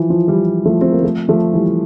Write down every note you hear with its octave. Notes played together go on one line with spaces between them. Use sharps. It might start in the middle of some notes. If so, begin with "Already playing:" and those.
Already playing: E3 F3
F3
E3 G3
F3 A3
C4
A#3
F3 A3
F3 A3
E3 G3